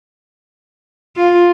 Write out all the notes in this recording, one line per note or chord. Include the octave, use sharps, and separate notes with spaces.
F4